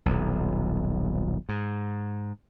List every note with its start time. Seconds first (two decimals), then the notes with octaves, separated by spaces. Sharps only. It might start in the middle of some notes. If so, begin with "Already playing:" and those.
0.06 D#1 B1
1.49 G#2